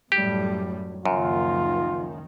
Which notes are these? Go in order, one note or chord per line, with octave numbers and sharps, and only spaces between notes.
F#2 A2 F#3 G3 A3 G4
F#1 C#2 F#2 D#3 F3 F4